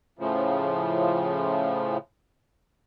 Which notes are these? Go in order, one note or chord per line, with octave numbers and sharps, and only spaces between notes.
A2 C#3 F3